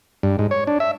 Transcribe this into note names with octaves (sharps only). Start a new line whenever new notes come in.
G2
G#2
C#5
D4
E5